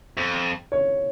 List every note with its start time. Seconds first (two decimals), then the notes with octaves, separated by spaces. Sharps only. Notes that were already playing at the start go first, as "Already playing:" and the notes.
0.17 F2
0.72 C#5